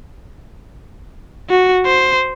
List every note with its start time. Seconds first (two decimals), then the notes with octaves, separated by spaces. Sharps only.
1.50 F#4
1.86 C5